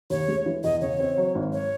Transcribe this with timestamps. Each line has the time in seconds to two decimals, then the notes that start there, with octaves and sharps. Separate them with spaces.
0.10 D#2 C#5
0.28 G#3
0.46 E3
0.64 E2 D#5
0.81 C#3 C#5
0.99 C4
1.18 F#3
1.35 G#1
1.53 C#5